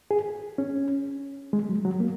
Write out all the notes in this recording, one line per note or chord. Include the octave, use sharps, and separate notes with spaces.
G#4
C#4
G#3
F#3
F#3
A#3